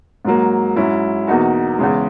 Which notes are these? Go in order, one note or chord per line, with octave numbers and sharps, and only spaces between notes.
G#2 F#3 A#3
G#2 F#3 C#4 E4
E2 B2 A#3 D#4 F#4
E2 C#3 G#3